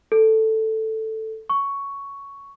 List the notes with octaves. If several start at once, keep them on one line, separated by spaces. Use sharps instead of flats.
A4
C#6